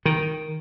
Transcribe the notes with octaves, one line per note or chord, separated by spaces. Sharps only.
D#3